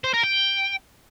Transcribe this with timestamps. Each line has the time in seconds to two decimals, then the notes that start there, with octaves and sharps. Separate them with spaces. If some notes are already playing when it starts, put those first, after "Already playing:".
0.04 C5
0.14 A#4
0.23 G5